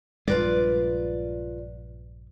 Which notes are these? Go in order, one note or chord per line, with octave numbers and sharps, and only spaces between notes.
A#1 G2 G#3 F4 B4 D5